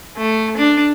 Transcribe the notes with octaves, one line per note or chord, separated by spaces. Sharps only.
A3
D4